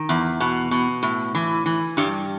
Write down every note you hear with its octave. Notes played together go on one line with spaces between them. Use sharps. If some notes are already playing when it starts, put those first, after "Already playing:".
Already playing: D#3
E2
B2
B2
A2
E3
E3
G2 G3